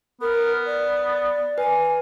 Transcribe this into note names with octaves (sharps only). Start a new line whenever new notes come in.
B3 A#4
D5
B4 G#5